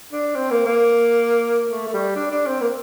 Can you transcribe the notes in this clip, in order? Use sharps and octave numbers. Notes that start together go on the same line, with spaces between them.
D4
C4
A#3
A#3
A3
A3
G3
D4
D4
C4
A#3